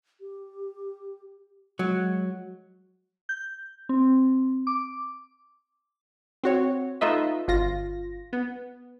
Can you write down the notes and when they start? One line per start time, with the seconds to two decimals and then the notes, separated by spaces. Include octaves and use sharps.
0.21 G4
1.79 F#3 G#3
3.29 G6
3.89 C4
4.67 D6
6.43 C4 F#4 C#5
7.01 A3 D#4 F4 B4 D#5 E5
7.48 G1 F4 A#6
8.33 B3